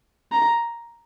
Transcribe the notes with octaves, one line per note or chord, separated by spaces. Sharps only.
A#5